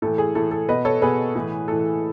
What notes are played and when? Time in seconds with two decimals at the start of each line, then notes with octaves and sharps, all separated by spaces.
0.02 A2 E3 A4
0.18 G#4
0.35 A2 E3 A4
0.51 A4
0.68 B2 B4 D#5
0.85 A4 C#5
1.01 B2 G#4 B4
1.35 A2 E3
1.68 A2 E3 A4